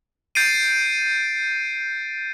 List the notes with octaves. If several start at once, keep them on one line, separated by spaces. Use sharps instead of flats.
G6 A6 C7 D7 D#7